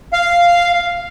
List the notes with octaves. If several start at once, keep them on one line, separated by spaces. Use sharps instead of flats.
F5